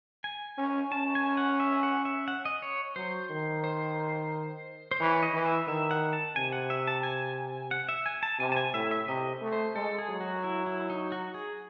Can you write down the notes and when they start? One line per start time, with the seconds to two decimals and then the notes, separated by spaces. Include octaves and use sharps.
0.24 G#5
0.58 C#4
0.92 C#4 A5
1.15 G#5
1.37 F#5
1.60 E5
1.83 F#5
2.05 E5
2.28 F#5
2.45 D#5
2.62 C#5
2.96 F#3 C5
3.30 D#3
3.64 C5
4.91 C5
5.00 E3 C#5
5.23 D#5
5.34 E3
5.46 E5
5.67 D#3 E5
5.91 F#5
6.13 A5
6.36 C3 G#5
6.53 F#5
6.70 E5
6.87 A5
7.03 G#5
7.71 F#5
7.89 E5
8.06 G#5
8.23 A5
8.40 C3 G#5
8.52 A5
8.56 G#5
8.74 A2 E5
8.91 E5
9.07 C3 D#5
9.42 A3
9.53 C5
9.76 G#3 A4
9.99 G#4
10.10 F#3
10.21 F#4
10.44 E4
10.66 E4
10.90 D#4
11.12 F#4
11.34 G#4